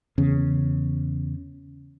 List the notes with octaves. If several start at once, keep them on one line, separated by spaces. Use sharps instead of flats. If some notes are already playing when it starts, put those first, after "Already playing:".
E2 C#3